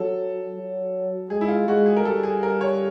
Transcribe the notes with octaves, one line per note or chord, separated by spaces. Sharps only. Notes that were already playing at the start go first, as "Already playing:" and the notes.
Already playing: F#3 A4
F#3
G#3 G#4
E4
F4
G#3 F#4
G#4
A#4
G3 A4
G#4
A#4
C#5